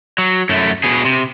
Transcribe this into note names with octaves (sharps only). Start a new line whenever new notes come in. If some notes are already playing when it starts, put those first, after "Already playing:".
F#3
F#2 A3
B2 G#4
C3